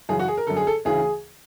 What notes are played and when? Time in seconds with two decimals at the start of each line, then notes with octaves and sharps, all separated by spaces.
0.09 F#2 C#3 E3 G#4
0.19 F#4
0.28 G#4
0.37 A#4
0.47 F#2 D3 A4
0.57 G#4
0.67 A4
0.85 D2 C#3 E3 G#4